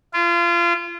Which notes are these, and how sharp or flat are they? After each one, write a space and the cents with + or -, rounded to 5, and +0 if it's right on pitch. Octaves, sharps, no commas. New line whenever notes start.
F4 -30